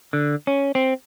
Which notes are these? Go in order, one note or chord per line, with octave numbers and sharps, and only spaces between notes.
D3
C#4
C4